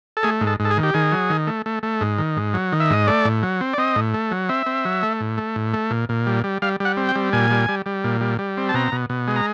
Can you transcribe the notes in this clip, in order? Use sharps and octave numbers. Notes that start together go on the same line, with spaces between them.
A4
A3 G#4
G#2
A4
G#2
A4
G#4
D#3
G4
D#3 G#4
F#3
D#3
A3
A3
A3
G#2
D#3
G#2
F#3
D#3
E5
G#2 D#5
A3 D5
A2
F#3
C4
D5
C4 D#5
A2
A3
F#3
C4 E5
C4
F#3
A3
A2
A3
A2
A3
A#2
A#2
G3
G3
G3 F5
G3 F#5
C4
G5
G3
A#2 G#5
G3
G3
G3
A#2
G3
G3
C4
A5
B2 A#5
B2
B2
G#3
A#5